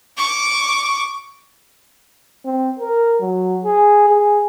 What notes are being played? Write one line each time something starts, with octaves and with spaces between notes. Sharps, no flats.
C#6 D6
C4
A#4
F#3
G#4
G#4